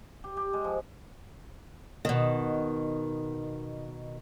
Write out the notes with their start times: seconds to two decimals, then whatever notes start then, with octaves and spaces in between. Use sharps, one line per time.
0.24 G4
0.37 G4
0.53 G#3
0.64 F3
2.05 B2 D#3